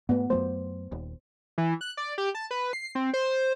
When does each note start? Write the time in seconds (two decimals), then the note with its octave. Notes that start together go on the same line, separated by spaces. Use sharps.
0.09 G#2 A3 B3
0.30 F#2 F#3 A3 C5
0.92 D#1 D#2
1.58 E3
1.81 F#6
1.97 D5
2.18 G4
2.35 A5
2.51 B4
2.73 C7
2.95 C4
3.14 C5